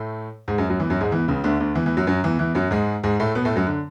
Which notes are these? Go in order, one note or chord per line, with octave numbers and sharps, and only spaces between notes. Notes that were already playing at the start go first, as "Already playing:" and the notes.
Already playing: A2 A3
G#2 G#3
F#2 F#3
F#2 F#3
E2 E3
F#2 F#3
G#2 G#3
E2 E3
C#2 C#3
D2 D3
D2 D3
E2 E3
E2 E3
F#2 F#3
F#2 F#3
E2 E3
E2 E3
F#2 F#3
G#2 G#3
G#2 G#3
A2 A3
B2 B3
A2 A3
F#2 F#3
D3